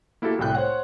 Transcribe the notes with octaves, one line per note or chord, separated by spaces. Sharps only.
A#3 E4 F#4 G4 A4
C2 A2 A3 G5 F#6
C5 C#5 F#5